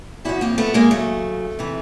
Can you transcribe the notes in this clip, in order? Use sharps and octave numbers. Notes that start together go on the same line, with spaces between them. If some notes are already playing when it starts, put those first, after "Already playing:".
E2 C3 F3 E4 F#4
A#3 C4
A3 B3
G#3 A#3
D#2 C#3 F#3 A3
C3 E3